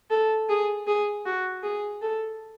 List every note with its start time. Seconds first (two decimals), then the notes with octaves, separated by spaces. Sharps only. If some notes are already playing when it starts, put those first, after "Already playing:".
0.10 A4
0.49 G#4
0.87 G#4
1.25 F#4
1.63 G#4
2.02 A4